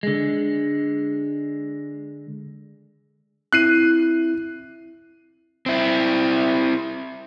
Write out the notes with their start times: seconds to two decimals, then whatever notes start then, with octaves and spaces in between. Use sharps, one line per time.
0.03 D3 G#3
3.53 C4 E4 F#6 C7 D#7
5.66 C4 E4